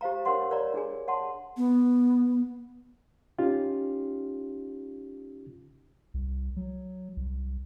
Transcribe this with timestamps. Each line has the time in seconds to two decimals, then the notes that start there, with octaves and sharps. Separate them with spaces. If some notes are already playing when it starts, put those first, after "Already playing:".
0.01 G4 C5 F5 A#5
0.25 D4 G4 A#4 C#5 F#5 C6
0.51 A#4 C#5 D5 A#5 B5
0.74 D4 G#4 G#5
1.08 C#5 F#5 A5 C6
1.57 B3
3.38 C#4 D#4 F4 G4
6.14 C2
6.56 F#3
7.17 C2